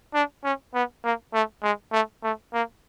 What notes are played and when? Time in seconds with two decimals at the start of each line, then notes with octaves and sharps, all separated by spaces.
0.14 D4
0.44 C#4
0.74 B3
1.04 A#3
1.34 A3
1.63 G#3
1.92 A3
2.23 A3
2.53 A#3